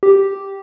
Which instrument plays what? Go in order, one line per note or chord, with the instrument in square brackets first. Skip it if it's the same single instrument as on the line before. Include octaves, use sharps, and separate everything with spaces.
[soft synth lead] G4